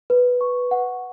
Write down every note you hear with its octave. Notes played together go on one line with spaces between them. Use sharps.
B4
C#6
F#5